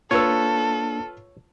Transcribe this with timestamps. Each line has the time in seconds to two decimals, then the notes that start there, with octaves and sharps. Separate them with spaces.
0.11 A#3 D4 F4 A4 B4 C#5 E6